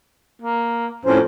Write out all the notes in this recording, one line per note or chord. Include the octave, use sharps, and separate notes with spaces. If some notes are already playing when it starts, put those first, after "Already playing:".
A#3
F2 A2 C#4 C5